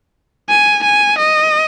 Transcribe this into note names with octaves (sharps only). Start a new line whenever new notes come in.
G#5
G#5
D#5